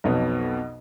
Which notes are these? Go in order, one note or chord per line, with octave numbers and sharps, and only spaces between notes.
B1 F2 B2 B3